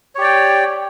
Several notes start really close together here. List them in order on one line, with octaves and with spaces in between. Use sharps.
C#5 G4 D5 G5